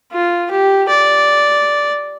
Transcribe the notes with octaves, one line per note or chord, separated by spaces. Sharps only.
F4
G4
D5